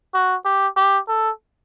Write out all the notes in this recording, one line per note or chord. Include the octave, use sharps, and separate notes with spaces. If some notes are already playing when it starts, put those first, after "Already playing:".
F#4
G4
G4
A4